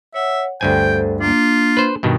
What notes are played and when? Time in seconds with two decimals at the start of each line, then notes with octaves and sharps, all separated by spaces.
0.14 C#5 E5 F#5
0.61 D2 G2 A4 C5 G5 G#5
1.21 A#3 D4 F4
1.77 B4 C5
2.03 G2 B2 D#3